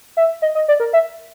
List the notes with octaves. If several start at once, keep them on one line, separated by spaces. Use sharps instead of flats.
E5
D#5
D#5
D5
A#4
E5